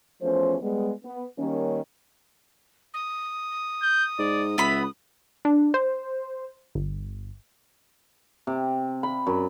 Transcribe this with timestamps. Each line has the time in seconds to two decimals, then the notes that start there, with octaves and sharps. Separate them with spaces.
0.22 E2 F3 A3 C#4 C5
0.62 G3 G#3 B3
1.04 B3
1.39 D#3 G3 A#3 C#4
2.94 D#6
3.82 G6
4.19 G#2 D5
4.58 C#2 B3 E5 B5
5.45 D4
5.74 C5
6.75 G1
8.47 C3
9.03 B5
9.26 F#2